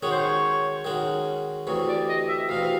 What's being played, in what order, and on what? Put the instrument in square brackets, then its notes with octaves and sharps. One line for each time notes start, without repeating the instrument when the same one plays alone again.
[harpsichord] D#3 G#3 C#4 F#4 [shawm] C#5
[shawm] C5
C#5
[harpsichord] D#3 G#3 C#4 F#4
[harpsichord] D2 C3 E3 [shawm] C#5
[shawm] D5
D#5
E5
[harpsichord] D2 C3 E3 [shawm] F5